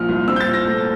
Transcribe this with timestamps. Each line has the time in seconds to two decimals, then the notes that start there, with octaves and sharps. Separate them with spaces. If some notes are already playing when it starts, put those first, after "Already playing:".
Already playing: A#1 A#2 F3 A#3 F6
0.09 C2
0.28 C4 E6
0.36 G6
0.40 A6
0.48 A#2
0.53 A#6
0.66 A3